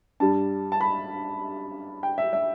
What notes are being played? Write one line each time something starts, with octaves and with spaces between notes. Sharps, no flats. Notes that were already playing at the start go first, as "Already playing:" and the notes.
G2 G3 A5
A5
B5
G5
E5
E5